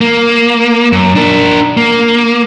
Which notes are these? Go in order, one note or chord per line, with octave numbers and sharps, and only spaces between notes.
A#3
F#2
D4 A#4
A#3